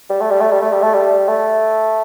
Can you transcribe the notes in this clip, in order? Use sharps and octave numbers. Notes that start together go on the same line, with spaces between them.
G3
A3
G3
A3
G3
A3
G3
A3
G3
A3